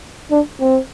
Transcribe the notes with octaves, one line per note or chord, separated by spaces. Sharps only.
D4
C4